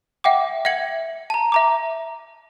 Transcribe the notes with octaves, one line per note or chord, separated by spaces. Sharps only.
E5 F#5 G5 D6
E5 F#5 G#6 C#7 F#7
A5 A#5
E5 A#5 D6